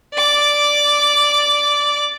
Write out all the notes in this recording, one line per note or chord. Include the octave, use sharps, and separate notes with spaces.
D5 D6